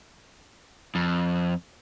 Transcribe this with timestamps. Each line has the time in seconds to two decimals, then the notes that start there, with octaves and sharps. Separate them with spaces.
0.95 F2